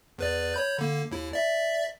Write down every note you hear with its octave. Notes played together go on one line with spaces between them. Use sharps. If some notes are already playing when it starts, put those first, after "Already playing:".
E2 B4 D5
C#5 B5 G6
D3 A#3
D#2 E4
D5 E5